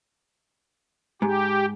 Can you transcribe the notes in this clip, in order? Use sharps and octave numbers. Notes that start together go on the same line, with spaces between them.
G#2 G4